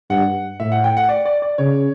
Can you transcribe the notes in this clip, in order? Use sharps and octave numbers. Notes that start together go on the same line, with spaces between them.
G2 F#5
A2 E5
F#5
G5
F#5
D5
D5
D5
C#3 C#5